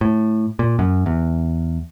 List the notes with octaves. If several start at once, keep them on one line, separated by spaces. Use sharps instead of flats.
A2
A#2
F#2
E2